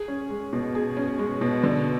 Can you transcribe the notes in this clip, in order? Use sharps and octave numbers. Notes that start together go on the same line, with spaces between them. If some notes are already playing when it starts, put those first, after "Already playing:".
Already playing: G#4
C#4
G#3
B2
G#4
C#4
G#3
B2
D3